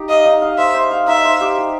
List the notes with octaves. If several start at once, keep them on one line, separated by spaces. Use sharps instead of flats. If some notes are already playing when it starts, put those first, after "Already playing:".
Already playing: D#4 G4
D#5 F5
D#4
F5
C5 E5
C5
F5
D#4 E5
C5
G4
G4